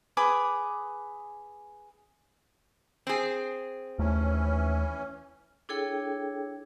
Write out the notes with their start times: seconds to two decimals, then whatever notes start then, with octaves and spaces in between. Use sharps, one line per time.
0.17 G#4 B4 D6 D#6
3.07 C4 G#4
3.99 D#2 E3 A3 C#4
5.69 D4 E4 G#4 A4 C#5 G5